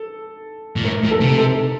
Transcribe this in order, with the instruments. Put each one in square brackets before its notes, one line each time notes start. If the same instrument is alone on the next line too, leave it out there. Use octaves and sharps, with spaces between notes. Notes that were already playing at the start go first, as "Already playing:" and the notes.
Already playing: [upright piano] A4
[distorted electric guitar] A#2
[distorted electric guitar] A2 [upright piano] A#4
[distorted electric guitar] A#2
[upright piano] A4
[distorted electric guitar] C3
[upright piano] A4